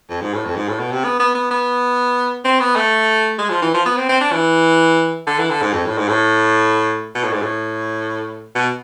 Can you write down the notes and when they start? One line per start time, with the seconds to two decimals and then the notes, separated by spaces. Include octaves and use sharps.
0.09 F2
0.21 G#2
0.34 A2
0.45 F2
0.56 G#2
0.69 A2
0.80 B2
0.92 C3
1.04 B3
1.19 B3
1.35 B3
1.51 B3
2.44 C4
2.60 B3
2.76 A3
3.38 G#3
3.50 F3
3.62 E3
3.74 F3
3.86 B3
3.97 C4
4.09 C4
4.21 D4
4.33 E3
5.27 D3
5.39 E3
5.50 D3
5.62 G#2
5.73 F2
5.86 A2
5.98 G#2
6.09 A2
7.15 B2
7.24 A2
7.33 G#2
7.42 A2
8.55 B2